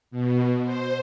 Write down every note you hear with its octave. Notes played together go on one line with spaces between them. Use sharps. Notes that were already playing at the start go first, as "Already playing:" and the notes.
B2
C5